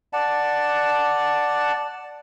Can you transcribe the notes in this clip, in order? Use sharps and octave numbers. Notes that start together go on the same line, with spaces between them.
D5 F#5 A5